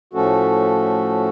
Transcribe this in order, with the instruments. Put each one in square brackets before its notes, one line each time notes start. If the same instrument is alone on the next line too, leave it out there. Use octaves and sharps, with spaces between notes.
[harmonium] A2 F3 A3 C#4 F#4 A4